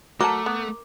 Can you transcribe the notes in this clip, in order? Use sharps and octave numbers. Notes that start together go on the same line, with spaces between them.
F#3 A3 A#4 A5 D6
B3